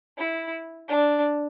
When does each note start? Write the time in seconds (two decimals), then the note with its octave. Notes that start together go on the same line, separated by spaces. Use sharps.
0.18 E4
0.89 D4